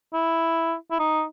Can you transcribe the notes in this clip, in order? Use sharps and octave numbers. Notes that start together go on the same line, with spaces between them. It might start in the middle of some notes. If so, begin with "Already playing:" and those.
E4
E4
D#4